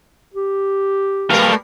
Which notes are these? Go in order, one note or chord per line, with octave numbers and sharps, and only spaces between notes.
G4
B2 G3 A3 A#4 F5